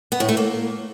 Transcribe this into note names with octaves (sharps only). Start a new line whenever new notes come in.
B3
A2
A3
A#3